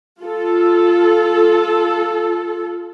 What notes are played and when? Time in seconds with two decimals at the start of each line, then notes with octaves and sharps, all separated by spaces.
0.20 F4 A4